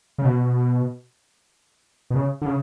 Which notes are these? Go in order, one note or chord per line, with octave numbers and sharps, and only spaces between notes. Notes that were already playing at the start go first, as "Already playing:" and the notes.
C#3
B2
B2
C#3
D3
C#3